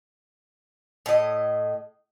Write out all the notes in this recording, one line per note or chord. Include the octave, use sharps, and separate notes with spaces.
A2 D#5